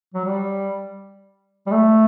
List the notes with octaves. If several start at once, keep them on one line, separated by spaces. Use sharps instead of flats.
F#3
G3
G3
A3